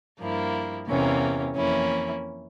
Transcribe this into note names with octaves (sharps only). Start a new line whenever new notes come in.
G2 F3 A#3 E4
E2 C3 E3 A#3 C#4
F2 E3 A#3 C#4 E4